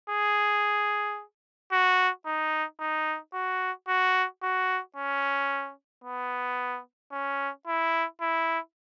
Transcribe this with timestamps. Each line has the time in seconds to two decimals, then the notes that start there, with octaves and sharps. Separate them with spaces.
0.10 G#4
1.72 F#4
2.27 D#4
2.80 D#4
3.34 F#4
3.88 F#4
4.43 F#4
4.96 C#4
6.04 B3
7.12 C#4
7.67 E4
8.21 E4